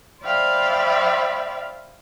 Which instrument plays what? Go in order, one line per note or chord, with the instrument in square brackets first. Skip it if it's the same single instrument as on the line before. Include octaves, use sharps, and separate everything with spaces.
[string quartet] C5 D5 E5 F5 G5 B5